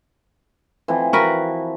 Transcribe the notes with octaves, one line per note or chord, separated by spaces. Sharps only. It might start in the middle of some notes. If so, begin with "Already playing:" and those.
E3 F3 C4
F#4 A#4 B4